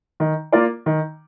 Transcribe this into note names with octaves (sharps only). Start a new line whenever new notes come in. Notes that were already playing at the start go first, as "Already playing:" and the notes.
D#3
A#3 F4 A#4 D5
D#3